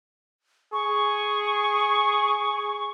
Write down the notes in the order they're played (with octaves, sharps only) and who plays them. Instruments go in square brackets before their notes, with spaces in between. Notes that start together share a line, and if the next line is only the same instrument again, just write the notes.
[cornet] G#4 [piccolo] C#6